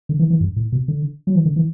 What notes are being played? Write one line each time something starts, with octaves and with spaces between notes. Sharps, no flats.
D3
E3
E3
G2
A2
B2
D3
F#3
E3
D3
E3